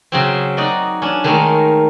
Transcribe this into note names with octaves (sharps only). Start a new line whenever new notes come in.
C#3 F#3 C4
D#4 F#4 D5 D#5
C#4 D4
D#3 G#3 A3 D#4 A#4